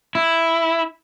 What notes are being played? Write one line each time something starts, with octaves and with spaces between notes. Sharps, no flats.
E4